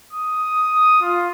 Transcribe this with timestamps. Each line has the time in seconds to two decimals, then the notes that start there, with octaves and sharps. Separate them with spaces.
0.13 D#6
1.02 F4